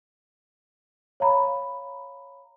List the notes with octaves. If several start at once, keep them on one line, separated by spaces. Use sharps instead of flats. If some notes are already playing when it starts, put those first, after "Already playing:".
C#5 F5 A#5 B5